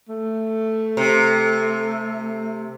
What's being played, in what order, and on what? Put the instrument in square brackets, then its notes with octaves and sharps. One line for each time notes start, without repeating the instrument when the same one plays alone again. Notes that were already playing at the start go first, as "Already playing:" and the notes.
[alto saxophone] A3
[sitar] C3